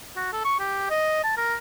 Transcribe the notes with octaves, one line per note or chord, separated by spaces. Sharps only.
F#4
A4
C#6
G4
D#5
A5
A#4